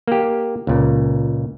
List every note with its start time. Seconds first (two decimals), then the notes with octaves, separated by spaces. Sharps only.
0.08 A#3 G4
0.67 C#2 A#2